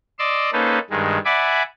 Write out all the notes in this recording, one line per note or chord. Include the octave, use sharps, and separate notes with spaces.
D5 D#5 C6 D6 E6
A#3 C#4 D#4 A4 B4 C5
G2 D#3 G#3
D5 E5 F#5 G#5 B5 D6